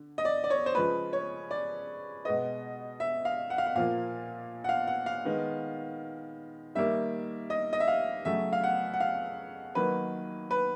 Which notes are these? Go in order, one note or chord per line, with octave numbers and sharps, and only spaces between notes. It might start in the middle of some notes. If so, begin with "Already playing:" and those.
Already playing: D3
D#5
D5
D5
C#5
C5
C#3 F3 G#3 B4
C#5
D5
B2 G#3 B3 D#5
E5
F5
F#5
F5
F#5
A#2 F3 A#3 F5
F#5
F5
F#5
F5
D#3 G#3 B3
D#3 G3 A#3 E5
D#5
D#5
E5
F5
C#3 F#3 A3 E5
F5
F#5
F#5
F5
D#3 F#3 A#3 B4
B4